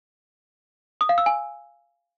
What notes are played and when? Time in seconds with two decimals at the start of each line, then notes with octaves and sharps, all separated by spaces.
1.01 D#6
1.09 F5
1.18 E6
1.26 G#5